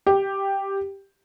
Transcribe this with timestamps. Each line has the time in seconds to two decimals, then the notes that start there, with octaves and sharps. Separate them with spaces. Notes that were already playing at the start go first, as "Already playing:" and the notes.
0.07 G4